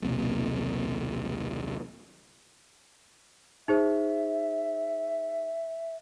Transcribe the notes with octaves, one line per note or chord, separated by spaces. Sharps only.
D#1 B1 C3 A#3
D#4 G#4 C5 E5